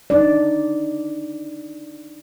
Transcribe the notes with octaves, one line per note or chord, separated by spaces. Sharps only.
D4 D#4 D5